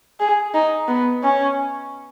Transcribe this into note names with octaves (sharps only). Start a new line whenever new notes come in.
G#4
D#4
B3
C#4